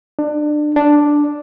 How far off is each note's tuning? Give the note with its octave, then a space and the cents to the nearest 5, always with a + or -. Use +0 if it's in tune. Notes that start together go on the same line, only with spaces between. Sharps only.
D4 +25
D4 +0